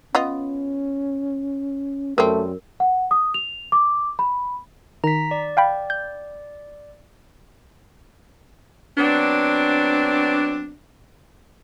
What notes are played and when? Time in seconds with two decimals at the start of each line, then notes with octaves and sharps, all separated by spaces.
0.15 B3 C#4 F4 D#5
2.18 F#2 G3 A3 C4 A#4
2.80 F#5
3.11 D#6
3.34 F7
3.72 D6
4.19 B5
5.04 D#3 A#5 B6
5.31 D5
5.57 F5 G5 B5
5.90 G6
8.98 F#3 B3 C4 D4